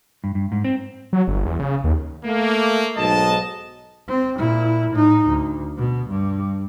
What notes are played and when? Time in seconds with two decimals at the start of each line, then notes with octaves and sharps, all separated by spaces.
0.24 G2
0.35 G2
0.52 G#2
0.64 C4
1.13 F#3
1.28 G1
1.46 E2
1.59 C#3
1.84 D#2
2.24 A3 A#3
2.97 B1 G#2 D#5 A5
4.08 C4
4.38 A#2 E4
4.91 A2 D#4
5.27 D2
5.78 B2
6.09 G2